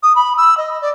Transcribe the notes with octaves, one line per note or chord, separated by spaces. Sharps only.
D#6
B5
E6
D#5
D5